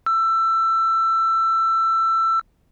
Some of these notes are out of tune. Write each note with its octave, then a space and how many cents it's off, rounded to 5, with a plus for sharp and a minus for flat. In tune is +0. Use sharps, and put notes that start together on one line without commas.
E6 +20